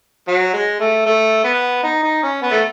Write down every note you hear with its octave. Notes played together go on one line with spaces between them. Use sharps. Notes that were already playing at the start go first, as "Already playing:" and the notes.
F#3
G#3
A3
A3
B3
D#4
D#4
C#4
B3
A3